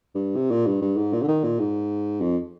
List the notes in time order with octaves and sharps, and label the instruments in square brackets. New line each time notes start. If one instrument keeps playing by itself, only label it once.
[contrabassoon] G2
C3
A#2
G2
G2
G#2
A#2
D3
D#3
A#2
G#2
F2